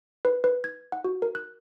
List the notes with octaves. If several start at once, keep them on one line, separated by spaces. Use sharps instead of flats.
B4
B4
G#6
F#5
F#4
A#4
F#6